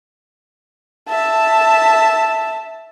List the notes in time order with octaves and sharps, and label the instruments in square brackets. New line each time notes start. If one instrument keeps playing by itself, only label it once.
[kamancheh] E5 A5